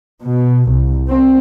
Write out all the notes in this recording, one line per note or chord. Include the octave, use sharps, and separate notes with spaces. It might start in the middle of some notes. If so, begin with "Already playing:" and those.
B2
C2
C4